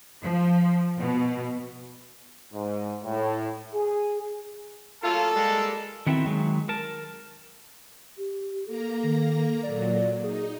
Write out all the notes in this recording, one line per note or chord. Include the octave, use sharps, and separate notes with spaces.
F3
B2
G#2
A2
G#4
F#3 A3 A#3 F4 A4
G3 G#3
D#3 B3 C4 E4 F#4 E5
D#3 F#3 G#3
A#4 A5
G4
A#3 A4 A#5
D#3
A#2 F#3 D5
D#4 G#4